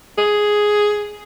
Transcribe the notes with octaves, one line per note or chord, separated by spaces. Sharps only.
G#4